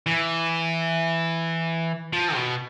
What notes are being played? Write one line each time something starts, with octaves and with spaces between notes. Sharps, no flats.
E3
F3
B2